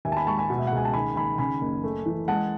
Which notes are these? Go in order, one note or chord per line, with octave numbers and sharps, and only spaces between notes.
D#2 E5 G#5
A5
G#5 B5
G#3 A5 C#6
G#5 B5
B2
E5
F#5
C#2 G#5
A5
D#3 G#5 B5
D#3 G#5 B5
C#3 G#5 B5
F#1
A3
E3
G#3 F#5 A5